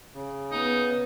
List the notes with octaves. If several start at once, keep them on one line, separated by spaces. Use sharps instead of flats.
C#3
B3 D#4